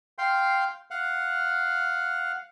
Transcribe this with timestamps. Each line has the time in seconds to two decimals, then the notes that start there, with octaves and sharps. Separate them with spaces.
0.18 F5 G5 C6
0.91 F5 F#5